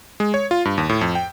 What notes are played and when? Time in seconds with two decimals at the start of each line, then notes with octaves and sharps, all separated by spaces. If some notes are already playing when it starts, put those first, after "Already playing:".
0.20 G#3
0.34 C#5
0.51 F4
0.65 G2
0.78 D#2
0.89 A2
1.01 F2
1.15 G5